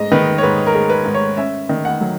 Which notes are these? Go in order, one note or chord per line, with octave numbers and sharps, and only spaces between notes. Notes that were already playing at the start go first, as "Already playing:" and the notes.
Already playing: G#2 G#3 D#5
D#3 B4
C#5
G#2 B4
A#4
G#3
B4
G#2
C#5
C#4 E5
D#3
F#5
F#3